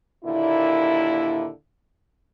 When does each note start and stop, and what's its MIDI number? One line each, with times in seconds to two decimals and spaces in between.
0.25 1.49 39
0.25 1.49 46
0.25 1.49 50
0.25 1.49 64